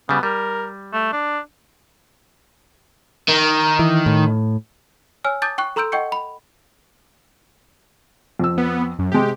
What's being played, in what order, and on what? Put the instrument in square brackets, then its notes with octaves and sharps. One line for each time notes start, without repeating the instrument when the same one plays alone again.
[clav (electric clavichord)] C#3 G3 [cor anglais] B3
[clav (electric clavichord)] G3 [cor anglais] A#4
[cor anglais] A3
D4
[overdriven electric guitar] D#3
[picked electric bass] E3
A2
[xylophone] C#5 G#5 E6 F6
A5 D6 D#6 G6 A6
G5 C#6 F#6
A4 A#5 C6 E6 G6 D7
D#5 F#5 G5 C#6 G6 C#7
B5
[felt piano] F2 E6
[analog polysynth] B3
F#2
[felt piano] C3 G#3 [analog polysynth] G4